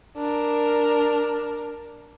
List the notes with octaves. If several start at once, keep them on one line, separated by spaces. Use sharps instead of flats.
D4 A#4